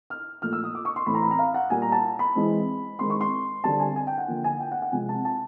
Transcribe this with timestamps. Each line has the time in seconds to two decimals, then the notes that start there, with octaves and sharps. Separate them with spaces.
0.10 F6
0.42 A#2 F3 A3 F6
0.53 E6
0.64 D#6
0.75 D6
0.85 C#6
0.96 C6
1.06 A2 E3 A3 C4 B5
1.15 A#5
1.23 B5
1.31 A#5
1.39 F5
1.54 F#5
1.70 A#2 G3 A#3 G#5
1.82 A#5
1.92 A5
2.19 B5
2.35 E3 G#3 C4
2.99 D#3 G#3 C4 C6
3.10 C#6
3.21 C6
3.64 D3 G3 C4 A5
3.80 G#5
3.96 G#5
4.07 G5
4.18 F#5
4.28 D3 F3 A#3
4.44 G#5
4.60 G5
4.71 F#5
4.82 F#5
4.92 C3 F3 G#3 C4 G#5
5.09 A5
5.25 A5